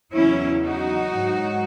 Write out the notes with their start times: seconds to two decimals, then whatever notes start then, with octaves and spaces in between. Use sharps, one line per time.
0.14 E2 C#3 F#3 C#4 E4
0.63 D#4 F#4
1.12 G#2 F#3